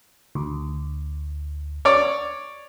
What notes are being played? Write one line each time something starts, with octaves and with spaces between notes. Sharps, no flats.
D2
C#5 D5